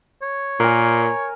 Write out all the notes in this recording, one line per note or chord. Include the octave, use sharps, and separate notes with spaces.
C#5
A#2 A#4 G#5